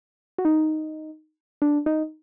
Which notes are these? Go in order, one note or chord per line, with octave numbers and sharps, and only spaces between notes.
F#4
D#4
D4
D#4